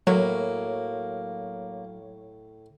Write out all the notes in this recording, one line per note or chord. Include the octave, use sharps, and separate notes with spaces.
A2 F#3 A#3 C#5